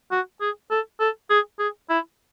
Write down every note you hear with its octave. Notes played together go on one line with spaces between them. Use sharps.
F#4
G#4
A4
A4
G#4
G#4
E4